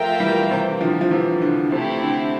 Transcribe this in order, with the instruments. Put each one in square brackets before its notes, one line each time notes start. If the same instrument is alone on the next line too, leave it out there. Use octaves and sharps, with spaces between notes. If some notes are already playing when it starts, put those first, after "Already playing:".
Already playing: [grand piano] F3 A3 [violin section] F4 A#4 E5 G5
[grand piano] E3 G3
C3 E3
D3 F3
F3
C3 E3
D3
[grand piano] C3 [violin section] A3 C4 E4 G4
[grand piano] D3